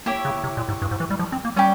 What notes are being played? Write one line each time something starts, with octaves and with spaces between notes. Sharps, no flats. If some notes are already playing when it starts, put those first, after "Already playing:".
A#3 E4 G4 C#5
C#3
C3
A#2
G#2
G2
G#2
E3
G3
F3
C4
A#3
G3 C#4 G4